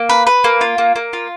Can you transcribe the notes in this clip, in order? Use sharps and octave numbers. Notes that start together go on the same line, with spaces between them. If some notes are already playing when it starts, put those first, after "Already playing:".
Already playing: A#3
B4
B4
A#3
F4
A#3
A#3
F4